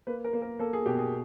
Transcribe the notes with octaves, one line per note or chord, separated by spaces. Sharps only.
A#3 B4
A#4
A#3
A#4
A#3 A4
G#4
B2 G4
G#4